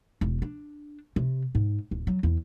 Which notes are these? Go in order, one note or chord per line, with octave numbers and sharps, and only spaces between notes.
E1
D4
C3
G#2
D1
F#3
E2